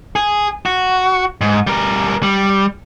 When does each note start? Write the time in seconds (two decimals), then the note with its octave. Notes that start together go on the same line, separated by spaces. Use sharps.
0.16 G#4
0.66 F#4
1.41 G#2
1.67 G3 A#4
2.23 G3